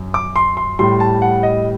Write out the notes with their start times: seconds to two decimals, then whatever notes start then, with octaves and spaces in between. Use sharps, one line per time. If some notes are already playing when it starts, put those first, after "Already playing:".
Already playing: F#2
0.14 D6
0.36 C6
0.57 C6
0.79 A2 G3 C6
1.00 A5
1.22 F#5
1.43 D#5